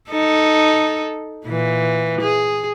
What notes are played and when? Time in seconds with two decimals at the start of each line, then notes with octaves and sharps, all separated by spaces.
0.11 D#4 A4
1.46 A#2 E3
2.21 G#4